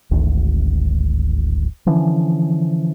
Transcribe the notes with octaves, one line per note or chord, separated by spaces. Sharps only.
D1 G#1 D2
D3 E3 F3 C#4